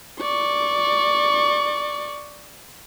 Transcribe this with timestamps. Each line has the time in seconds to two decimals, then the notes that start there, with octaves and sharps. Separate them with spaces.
0.22 D5 C#6